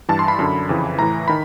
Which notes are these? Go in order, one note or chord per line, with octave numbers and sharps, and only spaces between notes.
G2 E3 A5
C6
B5
F#2 D3
F2 C#3 E3
A2 E3 A#5
D#3 B5